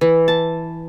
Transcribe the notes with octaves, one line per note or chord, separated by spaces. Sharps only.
E3
A5